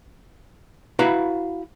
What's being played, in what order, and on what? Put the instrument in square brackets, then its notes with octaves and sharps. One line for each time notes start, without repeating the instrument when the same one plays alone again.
[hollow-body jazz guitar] E4 F#4 B4 F5 A#5 B5